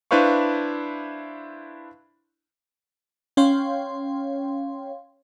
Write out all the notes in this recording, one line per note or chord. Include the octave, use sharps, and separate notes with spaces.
D4 E4 B4 C5 F5 C#6
C#4 C#5 F5 G5 C6